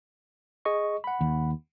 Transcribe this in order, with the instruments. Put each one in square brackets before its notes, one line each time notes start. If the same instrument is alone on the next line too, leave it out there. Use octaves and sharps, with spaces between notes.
[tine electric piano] G#4 D#5 C#6
F#5 B5
[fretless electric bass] D#2